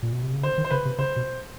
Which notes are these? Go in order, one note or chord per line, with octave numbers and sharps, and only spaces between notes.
A#2
B2
C3
C#3
D3 C5
D#3
C5
C#3 B4
C3
C#3 C5
B2